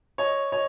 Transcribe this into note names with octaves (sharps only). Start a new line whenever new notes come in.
C#5 D#5
C#5 D#5